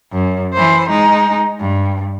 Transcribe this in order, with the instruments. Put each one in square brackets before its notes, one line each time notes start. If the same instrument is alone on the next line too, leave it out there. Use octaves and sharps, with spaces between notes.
[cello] F#2
E3 C5
G#3 D#4
G2